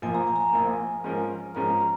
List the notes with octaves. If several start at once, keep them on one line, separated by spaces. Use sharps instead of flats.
A#1 A#2 F3 A#3 G#5
A#5
G#5
A#5
G#5
A#1 A#2 F3 A#3
G#2 F3 C#4 A#4
G#2 F3 C#4 A#4 A#5
A#5